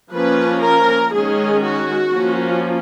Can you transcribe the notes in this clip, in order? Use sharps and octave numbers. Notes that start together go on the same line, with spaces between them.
F3 A#3 C#4 B4
A#4
D#3 G#3 C#4 G#4
F#4
F3 A#3 C#4